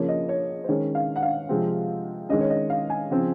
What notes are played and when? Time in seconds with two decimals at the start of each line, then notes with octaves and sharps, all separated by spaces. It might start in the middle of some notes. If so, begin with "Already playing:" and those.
Already playing: C#3 F3 A#3 C#5
0.08 D#5
0.29 C#5
0.64 C5
0.68 D#3 G#3 C#4 C#5
0.95 F5
1.16 F#5
1.22 F5
1.49 C3 F3 G#3 C4
2.29 D#3 G#3 C#4 D#5
2.41 C#5
2.50 D#5
2.70 F5
2.90 G#5
3.10 C#3 F3 C4